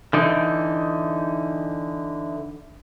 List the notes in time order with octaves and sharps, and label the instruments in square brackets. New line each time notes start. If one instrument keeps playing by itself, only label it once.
[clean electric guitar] D3 E3 D#4